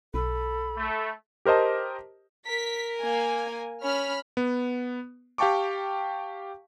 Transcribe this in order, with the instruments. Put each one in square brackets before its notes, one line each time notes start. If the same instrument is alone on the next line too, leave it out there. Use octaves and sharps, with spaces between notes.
[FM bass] B1 [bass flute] A4 [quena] B5
[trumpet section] A3
[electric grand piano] G4 A#4 C5 D#5 A5
[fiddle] A#4 [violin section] B6
[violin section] A#3 G#5
[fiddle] C#4 [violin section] B5 F6
[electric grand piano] B3
G4 F5 G5 A5 C#6 D6